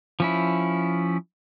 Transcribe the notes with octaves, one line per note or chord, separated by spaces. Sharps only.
F3 C#4 E4